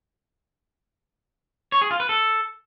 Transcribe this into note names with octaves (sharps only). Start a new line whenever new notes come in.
C#5
G#4
F4
B4
A4